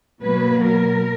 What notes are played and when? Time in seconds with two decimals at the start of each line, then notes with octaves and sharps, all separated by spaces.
0.23 B2 F#3 A#3 B4
0.64 A#4